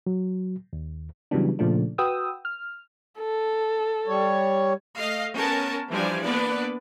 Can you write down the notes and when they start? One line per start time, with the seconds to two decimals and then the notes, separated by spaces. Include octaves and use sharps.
0.07 F#3
0.73 D#2
1.31 C#3 E3 F#3 G3 B3 D4
1.59 A#2 C#3 F3 A3 D4
1.98 F#4 B4 G5 D#6 E6
2.45 F6
3.19 A4
4.07 G3 C#5
4.99 A3 D#5 F5
5.36 B3 C#4 A#4 A5
5.90 E3 F3 G3 D4 D5 G#5
6.21 A#3 B3 D4 B4 D5